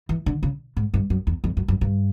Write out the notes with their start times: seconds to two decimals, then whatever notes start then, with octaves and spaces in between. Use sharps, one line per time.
0.09 E3
0.26 D3
0.43 C#3
0.77 G#2
0.94 G2
1.10 F#2
1.27 E2
1.44 F2
1.57 F#2
1.68 F#2
1.81 G2